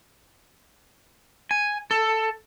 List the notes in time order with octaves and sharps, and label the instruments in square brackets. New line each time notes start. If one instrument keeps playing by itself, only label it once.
[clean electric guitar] G#5
A4